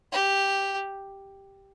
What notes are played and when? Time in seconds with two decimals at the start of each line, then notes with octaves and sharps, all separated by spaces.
0.12 G4